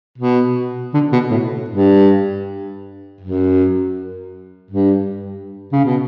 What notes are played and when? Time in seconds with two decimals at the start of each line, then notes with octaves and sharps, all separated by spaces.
0.18 B2
0.94 D3
1.12 B2
1.31 A2
1.69 G2
3.21 F#2
4.71 G2
5.72 C#3
5.85 B2